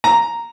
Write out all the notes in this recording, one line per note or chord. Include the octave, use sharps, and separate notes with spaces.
A#5